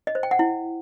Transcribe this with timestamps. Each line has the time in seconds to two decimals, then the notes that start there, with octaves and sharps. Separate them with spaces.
0.07 D#5
0.15 C5
0.23 G5
0.31 F#5
0.39 E4